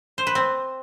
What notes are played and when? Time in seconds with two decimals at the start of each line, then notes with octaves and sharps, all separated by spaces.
0.18 C5
0.27 B4
0.35 C4